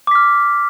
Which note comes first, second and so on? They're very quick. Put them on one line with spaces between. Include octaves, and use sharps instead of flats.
D6 B6 F6